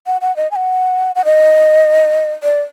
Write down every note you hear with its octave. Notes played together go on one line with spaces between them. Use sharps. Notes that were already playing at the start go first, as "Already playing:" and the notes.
F#5
F#5
D#5
G#5
F#5
F#5
D#5
D5